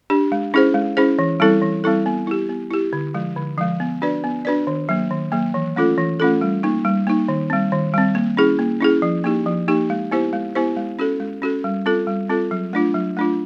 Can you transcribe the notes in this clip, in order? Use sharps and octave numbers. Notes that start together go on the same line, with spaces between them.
D4 G4
G#3
C#4 E4 G#4 C5
G#3
C#4 E4 G#4 C5
E3
G3 C4 E4 A4
E3
G3 C4 E4 A4
B3
E4 G4
B3
E4 G4
D3
F3 G#3
D3
F3 G#3
B3
D4 F#4 B4 D5
B3
D4 F#4 B4 D5
D#3
F#3 A#3
D#3
F#3 A#3
E3
A3 C#4 F4 A4
E3
A3 C#4 F4 A4
G3
A#3 D#4
G3
A#3 D#4
D#3
G3 C4
D#3
G3 C4
A#3
C#4 E4 G#4
A#3
C#4 E4 G#4
F3
A#3 D#4 G4
F3
A#3 D#4 G4
G#3
B3 E4 G4 C5
G#3
B3 E4 G4 C5
G#3
C#4 F#4 A4
G#3
C#4 F#4 A4
G3
C4 F4 A4
G3
C4 F4 A4
F#3
A3 D4 F4
F#3
A3 D4 F4